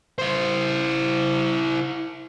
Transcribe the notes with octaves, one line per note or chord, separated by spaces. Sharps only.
E4 C5